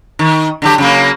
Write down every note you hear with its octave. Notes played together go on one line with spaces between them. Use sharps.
D#3
D3 F#3 G4
C#3 F#3 A#3